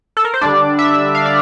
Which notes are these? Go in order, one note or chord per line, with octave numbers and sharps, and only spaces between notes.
A4
A#4
C5
D3 G3 D4 D5
E5
F5
D5